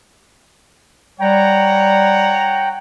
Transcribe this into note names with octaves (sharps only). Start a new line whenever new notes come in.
G3 C#5 F#5 G5 A#5